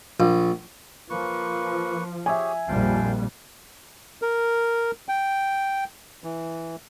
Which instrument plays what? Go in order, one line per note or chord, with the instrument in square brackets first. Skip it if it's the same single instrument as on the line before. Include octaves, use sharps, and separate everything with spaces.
[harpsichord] A#1
[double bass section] F3 [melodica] A#3 B4 C#6
[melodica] G4 G#4 C#5 [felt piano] E5 G#5
[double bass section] A#1 F2 G3 [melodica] F5 G5 A5
[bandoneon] A#4
G5
E3